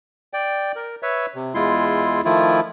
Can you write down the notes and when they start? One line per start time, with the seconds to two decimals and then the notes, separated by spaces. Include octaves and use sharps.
0.34 D5 G5
0.76 A#4
1.03 B4 C#5 E5
1.35 C3
1.55 E2 G#3 E4 F4 C6
2.25 D#3 F3 A3 E4 F4